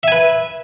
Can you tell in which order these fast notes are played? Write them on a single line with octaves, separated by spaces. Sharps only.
E5 G#5 B4